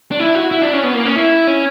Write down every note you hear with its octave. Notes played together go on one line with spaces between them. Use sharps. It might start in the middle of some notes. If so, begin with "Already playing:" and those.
D4
E4
F#4
E4
D4
C#4
B3
A#3
C#4
E4
C#4